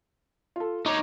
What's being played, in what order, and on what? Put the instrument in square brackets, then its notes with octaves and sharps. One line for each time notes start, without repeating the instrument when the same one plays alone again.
[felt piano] F4 A4
[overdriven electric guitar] D#4 C#5 [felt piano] D6